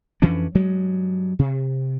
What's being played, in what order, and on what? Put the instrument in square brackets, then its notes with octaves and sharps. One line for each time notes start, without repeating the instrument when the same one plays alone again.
[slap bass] F2 E3 C#4 D4
G2 F#3 G#3
C3